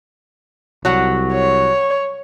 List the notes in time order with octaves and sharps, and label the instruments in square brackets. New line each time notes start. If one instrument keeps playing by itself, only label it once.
[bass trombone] C2 [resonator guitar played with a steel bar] F#3 F#5
[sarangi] C#5